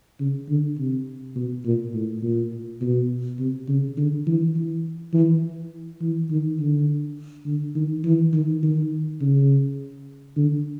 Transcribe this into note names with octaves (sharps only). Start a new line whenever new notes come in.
C#3
D3
C3
B2
A#2
A2
A#2
B2
C3
C#3
D3
E3
E3
E3
E3
D#3
D3
D3
D#3
E3
D#3
D#3
C#3
D3